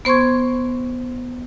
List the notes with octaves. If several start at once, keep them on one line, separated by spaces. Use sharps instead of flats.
B3 C5 C6 C#6 G#6